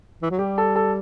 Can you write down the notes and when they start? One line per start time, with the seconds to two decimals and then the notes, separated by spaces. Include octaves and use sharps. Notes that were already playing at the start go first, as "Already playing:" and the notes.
0.22 E3
0.31 F#3
0.39 G3 G4
0.58 A4
0.76 A4